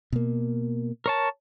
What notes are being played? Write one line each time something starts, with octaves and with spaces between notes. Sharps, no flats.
B2 A#3
A#4 C#5 A5